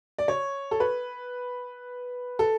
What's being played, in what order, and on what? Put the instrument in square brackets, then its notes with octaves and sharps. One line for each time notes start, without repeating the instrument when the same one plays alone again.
[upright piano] D5
C#5
A4
B4
A4